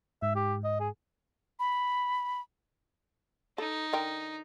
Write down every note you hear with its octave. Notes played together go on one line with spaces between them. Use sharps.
G#2 E5
G4
D#5
G#4
B5
D#4 A4
D3 A#4 G5